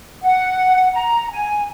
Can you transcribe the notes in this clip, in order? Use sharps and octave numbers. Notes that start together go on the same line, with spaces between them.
F#5
A#5
G#5